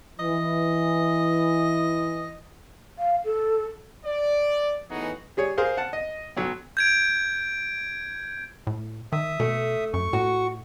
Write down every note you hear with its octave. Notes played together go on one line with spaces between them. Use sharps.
E3 D#5
F5
A4
D5
A2 E3 B3 D#4 F#4 G#4
G3 G#4 C#5
G#4 A#4 C5 F5
F#5 A5
D#5
B1 F#3
G6 G#6 D7
A2
D#3 E5 D#6
B2 A3
F#2 C#6
A2 F#4